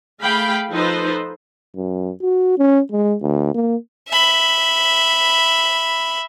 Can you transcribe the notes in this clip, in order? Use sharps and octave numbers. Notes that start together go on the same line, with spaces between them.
A3 G#4 F5 G5 B5
F3 D#4 A4 B4 C5
F#2
F#4
C#4
G#3
D2
A#3
E5 B5